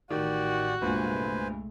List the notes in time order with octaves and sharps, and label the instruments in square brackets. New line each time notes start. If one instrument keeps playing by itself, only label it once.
[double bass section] A1 [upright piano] D#3 [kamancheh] F#4 [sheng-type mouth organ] G4 D5
[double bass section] C2 G#3 A3 [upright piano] G2 A#2 [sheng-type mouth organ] B4 C5 G#5